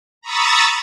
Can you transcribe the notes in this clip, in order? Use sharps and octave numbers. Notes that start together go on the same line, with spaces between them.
A#5 B5 C#6 D#6 E6 A6